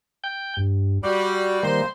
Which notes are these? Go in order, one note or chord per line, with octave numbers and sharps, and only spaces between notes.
G5 G6
G2
G3 F#4
D#3 G3 A#3 C5 C6